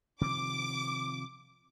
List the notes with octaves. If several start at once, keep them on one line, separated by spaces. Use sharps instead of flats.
C3 D#3 F3 D6